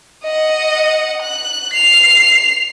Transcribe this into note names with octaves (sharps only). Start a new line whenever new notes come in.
D#5 F#5
F#6
C7 F7